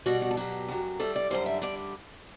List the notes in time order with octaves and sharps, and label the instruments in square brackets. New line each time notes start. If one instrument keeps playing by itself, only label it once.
[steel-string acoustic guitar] B2 G3 F#4
F#4
A4
B2 F#3 G4
F#2 F#3
A2 G3 A4
D5
F#2 D3 G3 C5
E5
D3 G3 D5